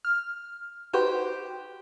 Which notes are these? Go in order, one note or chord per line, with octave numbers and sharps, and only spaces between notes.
F6
D#4 F#4 G4 B4 C5 G5